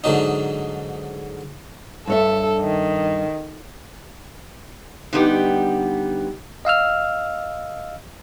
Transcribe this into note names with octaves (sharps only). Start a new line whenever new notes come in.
G#2 D3 F#3 D#4
G2 A4 C#5 E5
D#3
D3 G3 B3 D#4 G4 G5
D#5 F5 E6 F6